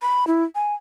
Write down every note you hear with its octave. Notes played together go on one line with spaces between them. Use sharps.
B5
E4
G#5